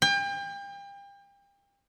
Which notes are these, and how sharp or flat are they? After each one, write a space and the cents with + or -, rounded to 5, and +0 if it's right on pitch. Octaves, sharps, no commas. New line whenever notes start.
G5 +35